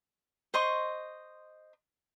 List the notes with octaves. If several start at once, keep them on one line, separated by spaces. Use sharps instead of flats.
C5 D#5 C6 C#6